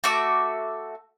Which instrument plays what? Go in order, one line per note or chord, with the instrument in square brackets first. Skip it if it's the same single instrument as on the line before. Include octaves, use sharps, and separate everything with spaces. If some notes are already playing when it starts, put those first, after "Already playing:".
[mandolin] A3 F#4 E5 D6